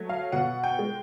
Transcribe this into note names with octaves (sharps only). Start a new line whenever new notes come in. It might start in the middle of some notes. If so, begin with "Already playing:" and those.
Already playing: F#3 A3
F5
B2 F#5
G5
G#3